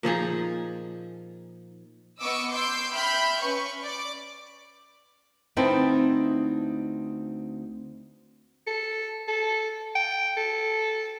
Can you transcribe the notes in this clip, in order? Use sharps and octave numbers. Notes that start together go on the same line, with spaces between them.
A#2 F3 D#4 G#4
B3 D#5 C#6 D6 E6
C6 D6 E6 G6
E5 G5 B5 F6 G6
C#4 B4 C#6
D5 D6
D2 C4 D#4 E4 B4 A5
A4
A4
G5
A4